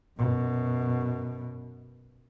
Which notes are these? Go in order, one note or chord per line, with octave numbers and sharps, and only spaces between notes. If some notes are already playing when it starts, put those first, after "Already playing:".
F#2 B2